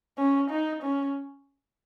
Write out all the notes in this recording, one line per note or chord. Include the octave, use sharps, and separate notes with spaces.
C#4
D#4
C#4